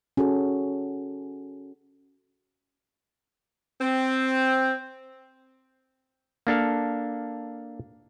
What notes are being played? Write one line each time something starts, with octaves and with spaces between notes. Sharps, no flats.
C#4 F#4 G#4 A4
C4
A#3 D4 A4 F5